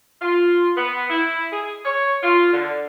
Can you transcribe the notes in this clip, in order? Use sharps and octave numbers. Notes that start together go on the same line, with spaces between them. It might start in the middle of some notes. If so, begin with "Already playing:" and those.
F4
B3
E4
G#4
C#5
F4
D3